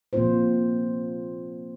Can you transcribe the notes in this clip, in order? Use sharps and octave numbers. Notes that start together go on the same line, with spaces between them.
A#2 F3 A#3 C4 F4 C5